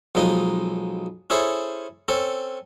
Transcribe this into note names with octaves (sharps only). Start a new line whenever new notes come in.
B1 F3 G#3 D#4
C#4 E4 G#4 A4 C5
C4 C#4 A4